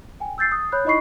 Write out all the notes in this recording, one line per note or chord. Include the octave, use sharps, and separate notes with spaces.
G5 G#5
E6 G6 A6 C7
D#6
C#5 B5 F#6 G6
D#4 E4 D#5 B5 C#6 C7